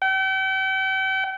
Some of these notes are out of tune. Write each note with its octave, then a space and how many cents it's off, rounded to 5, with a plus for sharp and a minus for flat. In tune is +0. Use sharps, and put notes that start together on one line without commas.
G5 -40